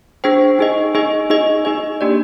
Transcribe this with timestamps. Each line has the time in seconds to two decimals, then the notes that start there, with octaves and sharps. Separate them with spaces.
0.24 D4 G#4 C5 G5
0.59 D#4 G#4 D#5
0.95 D#4 G#4 D#5
1.30 D#4 G#4 D#5
1.65 D#4 G#4 D#5
2.01 A#3 D4 G4 D5